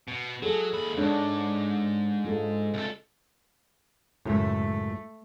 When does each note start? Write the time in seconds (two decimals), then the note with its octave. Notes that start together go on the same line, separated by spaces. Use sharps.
0.08 B2
0.42 F#3 G#4 A4
0.73 D#2 B5
0.97 G#2 G#3 D4 C#5
2.25 G#3 F4 A4
2.74 C2 A4
4.25 C#2 F#2 A2 A3